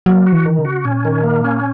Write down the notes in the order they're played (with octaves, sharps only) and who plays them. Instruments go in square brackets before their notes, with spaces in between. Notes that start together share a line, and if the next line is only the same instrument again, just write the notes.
[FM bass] F#3 [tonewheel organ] A#3
[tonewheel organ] F#4
[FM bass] E3
[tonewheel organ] D#3
[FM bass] C#3
[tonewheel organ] F#4
[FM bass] A#2 [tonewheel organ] C#4
[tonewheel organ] D#3
A#3
C#4